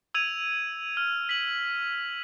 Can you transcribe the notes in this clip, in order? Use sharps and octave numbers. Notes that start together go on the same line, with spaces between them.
E6 G#6 D#7 F7
F6
B6 F#7